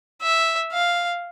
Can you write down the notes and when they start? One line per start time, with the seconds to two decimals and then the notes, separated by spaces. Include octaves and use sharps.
0.22 E5
0.72 F5